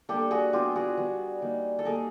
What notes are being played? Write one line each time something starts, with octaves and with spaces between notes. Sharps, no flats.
G3 A#3 D4 G4 A4
F#4 G#4
G3 B3 D4 F4 G4
F#4 G#4
G3 B3 D4
G3 A#3 D#4
A4
G3 A#3 D#4 G#4 A#4